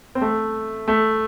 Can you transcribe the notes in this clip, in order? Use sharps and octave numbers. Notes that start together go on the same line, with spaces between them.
C4
A3
A3